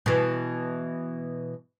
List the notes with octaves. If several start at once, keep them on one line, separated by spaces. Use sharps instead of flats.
B2 E3